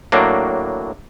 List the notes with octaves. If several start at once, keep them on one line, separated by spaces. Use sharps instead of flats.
A2 F#3 A#3 D4